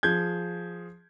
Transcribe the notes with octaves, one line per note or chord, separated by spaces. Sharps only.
F3 G#4 G6 G#6